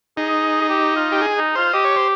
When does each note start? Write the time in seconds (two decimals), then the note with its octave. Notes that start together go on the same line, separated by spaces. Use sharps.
0.17 D#4 G#4
0.61 G#4
0.69 G4
0.96 F4
1.12 G4
1.22 G#4
1.38 D#4
1.55 F4 C5
1.73 G4 D#5
1.85 C#5
1.96 C5